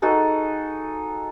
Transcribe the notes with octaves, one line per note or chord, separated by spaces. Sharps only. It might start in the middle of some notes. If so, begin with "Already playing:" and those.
D#4 F#4 G#4 A4